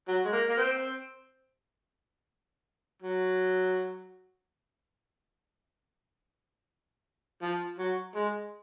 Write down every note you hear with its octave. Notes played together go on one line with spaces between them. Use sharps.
F#3
G#3
A#3
A#3
C4
F#3
F3
F#3
G#3